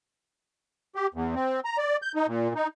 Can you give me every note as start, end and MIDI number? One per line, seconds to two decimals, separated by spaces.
0.95 1.07 67
1.14 1.35 40
1.35 1.60 60
1.65 1.77 82
1.78 1.97 74
2.02 2.12 91
2.15 2.27 63
2.27 2.53 46
2.55 2.67 63